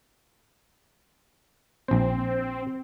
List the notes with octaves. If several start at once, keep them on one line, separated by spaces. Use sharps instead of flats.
A#1 C4 C5